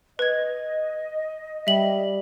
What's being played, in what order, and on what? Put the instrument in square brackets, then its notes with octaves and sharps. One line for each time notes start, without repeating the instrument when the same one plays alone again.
[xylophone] B4 G#6 [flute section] D#5
[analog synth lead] G3 [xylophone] E5 F#7